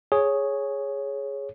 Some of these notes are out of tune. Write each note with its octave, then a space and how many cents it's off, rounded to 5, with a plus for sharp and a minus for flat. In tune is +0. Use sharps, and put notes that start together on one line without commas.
G#4 +0 C#5 +0